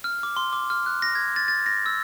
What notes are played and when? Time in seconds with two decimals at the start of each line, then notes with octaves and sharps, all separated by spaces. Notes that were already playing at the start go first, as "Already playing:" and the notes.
0.04 F6
0.23 D6
0.37 C6
0.53 D6
0.70 F6
0.86 F#6
1.02 A#6
1.15 G#6
1.36 A6
1.48 A6
1.66 A#6
1.86 E6